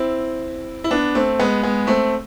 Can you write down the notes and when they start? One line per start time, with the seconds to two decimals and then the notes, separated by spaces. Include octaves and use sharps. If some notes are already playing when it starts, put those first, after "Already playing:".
Already playing: C4 E4
0.84 E4
0.91 B3 D4
1.15 A3 C4
1.40 G#3 B3
1.63 G#3 B3
1.87 A3 C4